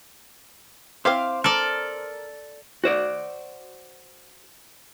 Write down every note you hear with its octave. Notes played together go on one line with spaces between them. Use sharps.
C4 E4 C5 F5 D6 F6
A4 A#4 D5
F#4 C5 D5